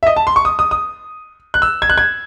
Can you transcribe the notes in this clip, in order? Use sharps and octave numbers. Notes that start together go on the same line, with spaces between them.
E5
D#5
A5
C6
C#6
D#6
D#6
D#6
F#6
E6
G#6
F#6
G#6